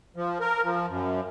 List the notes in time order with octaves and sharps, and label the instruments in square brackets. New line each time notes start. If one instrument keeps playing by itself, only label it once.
[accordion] F3
A#4
F3
F#2